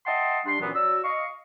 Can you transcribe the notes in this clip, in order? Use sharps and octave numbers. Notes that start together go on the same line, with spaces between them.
D#5 E5 F#5 G5 A5 C6
G3 D4 C6
F#2 A#2 E3 F#3 B3
F#3 F#4 D5 E6
D#5 F5 C#6